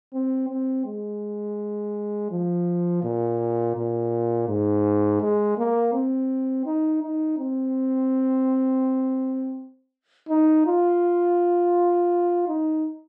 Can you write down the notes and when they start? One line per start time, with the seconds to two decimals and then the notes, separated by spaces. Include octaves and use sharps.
0.13 C4
0.49 C4
0.86 G#3
2.31 F3
3.03 A#2
3.75 A#2
4.48 G#2
5.21 G#3
5.58 A#3
5.93 C4
6.66 D#4
7.02 D#4
7.38 C4
10.29 D#4
10.66 F4
12.48 D#4